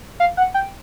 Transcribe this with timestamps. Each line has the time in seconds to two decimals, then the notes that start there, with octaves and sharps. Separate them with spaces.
0.20 F5
0.37 F#5
0.54 G5